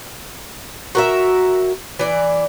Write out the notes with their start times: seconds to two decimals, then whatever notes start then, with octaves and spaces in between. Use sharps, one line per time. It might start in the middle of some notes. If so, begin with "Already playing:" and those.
0.95 F#4 A#4 E5
1.99 E3 D5